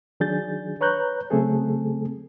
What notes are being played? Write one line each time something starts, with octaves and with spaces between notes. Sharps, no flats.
D#3 F#3 D4 G#4 G6 A6
B4 C#5 A#5 F#6 G6
C#3 F#3 A3 C4 G#4 A4